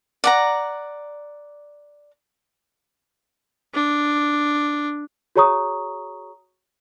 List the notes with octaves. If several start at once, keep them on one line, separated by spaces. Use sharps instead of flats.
D5 F#5 A#5
D4
F#4 G#4 C#5 A#5 C#6 D#6